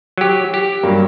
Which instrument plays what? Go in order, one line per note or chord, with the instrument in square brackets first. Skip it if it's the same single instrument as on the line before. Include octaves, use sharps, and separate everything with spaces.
[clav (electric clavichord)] F#3 G4
G4
[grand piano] G2 F#3 A#3